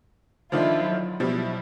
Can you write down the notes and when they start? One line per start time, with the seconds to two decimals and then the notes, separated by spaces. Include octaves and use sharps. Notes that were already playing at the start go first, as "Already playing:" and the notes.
0.52 D3 D#3 F3 D4 E4 F4
0.84 F#3
1.20 B2 F3 G3 E4